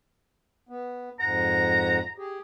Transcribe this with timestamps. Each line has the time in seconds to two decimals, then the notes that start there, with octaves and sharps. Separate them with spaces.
0.69 B3
1.20 F2 G#2 F#5 A#5
2.18 G4 G#4